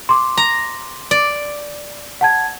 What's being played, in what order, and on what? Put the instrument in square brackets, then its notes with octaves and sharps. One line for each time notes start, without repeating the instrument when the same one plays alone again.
[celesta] C6 D6
[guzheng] A#5
D5
[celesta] F#5 A5 G#6